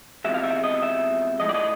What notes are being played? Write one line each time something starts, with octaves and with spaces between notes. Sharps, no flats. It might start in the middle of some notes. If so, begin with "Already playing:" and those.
E2 C3 F3 G#3 E5
F5
E5
D#5
E5
A2 F3 G#3 D#5
D5
D#5